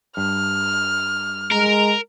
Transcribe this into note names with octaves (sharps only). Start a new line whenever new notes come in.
G2 F6
G#3 A#4